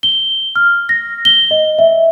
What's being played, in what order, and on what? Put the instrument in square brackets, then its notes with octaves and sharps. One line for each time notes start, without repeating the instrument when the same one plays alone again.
[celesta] G7
F6
A#6
G7
D#5
E5